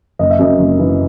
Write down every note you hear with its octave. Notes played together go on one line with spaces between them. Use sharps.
F#1 D#5
E5
F#2 D#5
F#1
E3